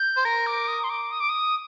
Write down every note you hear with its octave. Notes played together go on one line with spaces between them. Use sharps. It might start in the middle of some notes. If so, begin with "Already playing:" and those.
Already playing: G6
C5
A#4 A#6
D6
D#6
C6
D6
D#6
D6
D#6